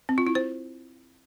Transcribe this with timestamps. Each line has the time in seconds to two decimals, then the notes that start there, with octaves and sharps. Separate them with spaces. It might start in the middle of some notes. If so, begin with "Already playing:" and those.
0.09 C4
0.18 F4
0.27 E4
0.35 C5